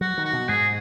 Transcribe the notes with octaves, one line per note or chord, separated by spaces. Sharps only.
F#3 F#4
D#3
F#4
B2
G#2 G#4